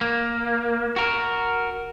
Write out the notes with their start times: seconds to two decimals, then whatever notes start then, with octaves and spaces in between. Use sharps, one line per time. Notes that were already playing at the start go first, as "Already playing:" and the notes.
0.01 A#3
0.96 F#4 A#4